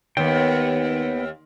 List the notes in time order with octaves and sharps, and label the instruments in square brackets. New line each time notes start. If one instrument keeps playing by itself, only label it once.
[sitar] D#2 [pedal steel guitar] B3 G5